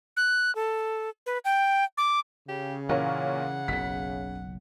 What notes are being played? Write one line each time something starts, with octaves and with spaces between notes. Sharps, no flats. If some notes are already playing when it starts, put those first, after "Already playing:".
F#6
A4
B4
G5
D6
C#3 G4
A#2 E3 C#4 A#4 F#5
F#1 B1 B6